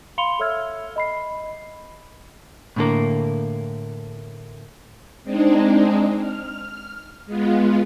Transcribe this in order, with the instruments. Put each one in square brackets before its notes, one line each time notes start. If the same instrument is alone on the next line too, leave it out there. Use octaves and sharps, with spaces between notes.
[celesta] F5 B5 C6 C#7 F7 G7
A4 C#5 E5 E6 F6 G#6
D#5 B5 C7
[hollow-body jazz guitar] A2 D3 A#3
[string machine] G#3 C4 D4 D#4
F6
G#3 B3 F4